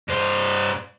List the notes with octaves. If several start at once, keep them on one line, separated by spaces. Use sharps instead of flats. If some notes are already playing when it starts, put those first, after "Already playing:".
G2 C5